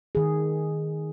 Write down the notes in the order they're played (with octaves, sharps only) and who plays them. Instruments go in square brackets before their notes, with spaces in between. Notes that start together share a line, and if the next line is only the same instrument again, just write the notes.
[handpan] D#3 G#4